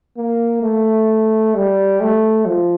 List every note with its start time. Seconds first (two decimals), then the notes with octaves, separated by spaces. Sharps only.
0.18 A#3
0.63 A3
1.55 G3
2.01 A3
2.46 F3